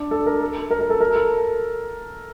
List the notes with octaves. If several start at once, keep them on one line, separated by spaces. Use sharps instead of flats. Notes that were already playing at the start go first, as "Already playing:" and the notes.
Already playing: D4
A4
A#4
A4
A#4
A#4
A4
A#4
A4